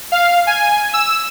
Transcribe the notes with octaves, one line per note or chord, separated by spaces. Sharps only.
F5
G#5
E6